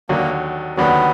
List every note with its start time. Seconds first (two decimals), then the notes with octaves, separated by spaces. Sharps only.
0.09 D#2 D3 F#3 A#3
0.77 D#2 D3 F#3 B3